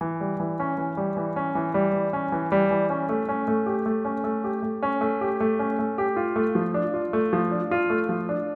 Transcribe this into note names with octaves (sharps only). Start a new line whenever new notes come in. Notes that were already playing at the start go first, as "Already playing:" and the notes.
E3
G3
E3
C#4
E3
G3
E3
C#4
E3
G3
E3
C#4
E3
G3
E3
C#4
A3
C#4
A3
G4
A3
C#4
A3
G4
A3
C#4
A3
G4
A3
C#4
A3
G4
F4
A3
F3
D4
F4
A3
F3
D4
F4
A3
F3
D4